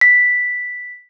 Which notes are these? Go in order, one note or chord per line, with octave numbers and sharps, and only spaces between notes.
B6